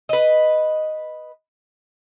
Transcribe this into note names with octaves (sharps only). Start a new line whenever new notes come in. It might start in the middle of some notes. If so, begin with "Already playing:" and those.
B4 D#5